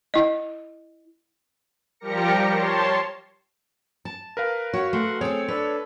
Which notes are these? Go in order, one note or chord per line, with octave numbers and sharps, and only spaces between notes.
E4 D#5
F3 G3 G4 A#4 A#6 C#7
C#5 A5 C6
A5
A#4 B4 F5
F#4 C#5
A3 F#4 F#5 C6
C4 G#4 A4 C#5
D4 A4 B4